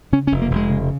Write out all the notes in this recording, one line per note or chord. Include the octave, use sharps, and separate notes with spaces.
C#3 C#4
C#4
F1
A#3
F1 G#3
C#3